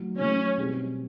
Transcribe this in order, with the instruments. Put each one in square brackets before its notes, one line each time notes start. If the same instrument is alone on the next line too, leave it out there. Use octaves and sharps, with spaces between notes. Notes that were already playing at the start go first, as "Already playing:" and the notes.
Already playing: [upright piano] D#3 F#3 A3
[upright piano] D#3 F#3 A3 [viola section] C#4
[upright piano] B2 G3 C4 D#4 G4